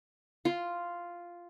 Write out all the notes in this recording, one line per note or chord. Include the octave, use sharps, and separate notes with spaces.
F4